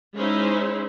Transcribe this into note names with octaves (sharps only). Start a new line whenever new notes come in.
G#3 C#4 D#4 E4 C5